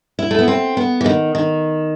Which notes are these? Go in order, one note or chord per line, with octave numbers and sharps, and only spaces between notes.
E4
A3
B3
C4
B3
E3
D#3
D#3